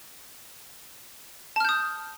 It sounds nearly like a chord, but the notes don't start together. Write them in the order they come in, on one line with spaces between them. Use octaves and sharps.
A5 F6 G6 D#6